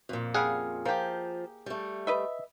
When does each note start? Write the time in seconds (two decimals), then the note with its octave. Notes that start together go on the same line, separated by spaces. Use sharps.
0.09 F2 A#2
0.34 C#3 G3 G#4 F5 F#5
0.85 F3 A#3 G4
1.66 G3 A3
2.07 B4 D#5 E5